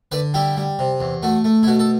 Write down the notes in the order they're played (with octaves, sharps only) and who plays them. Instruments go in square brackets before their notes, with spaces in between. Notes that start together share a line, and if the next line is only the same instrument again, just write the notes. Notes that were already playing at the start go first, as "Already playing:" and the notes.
[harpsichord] D3 B4 D5
G3 E4 G4
G3
C3
E2
A3 F#4
A3
E4
B2 F#4
A4